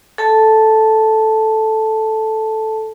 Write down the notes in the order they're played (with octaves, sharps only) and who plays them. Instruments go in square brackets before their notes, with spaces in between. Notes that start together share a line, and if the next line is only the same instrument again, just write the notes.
[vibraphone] A4 A5